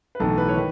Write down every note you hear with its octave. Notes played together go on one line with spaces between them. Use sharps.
B4
B1 A2 E3 A4
B4
C#5
D#3 B4